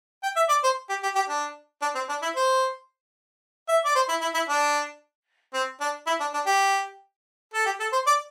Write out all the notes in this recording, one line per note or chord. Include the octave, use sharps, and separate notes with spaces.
G5
E5
D5
C5
G4
G4
G4
D4
D4
C4
D4
E4
C5
E5
D5
C5
E4
E4
E4
D4
C4
D4
E4
D4
D4
G4
A4
G4
A4
C5
D5